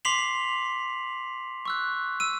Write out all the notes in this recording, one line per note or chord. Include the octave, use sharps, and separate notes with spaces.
C6 D6 B6 C7 F7 F#7
C#6 E6 F#6
E6 D#7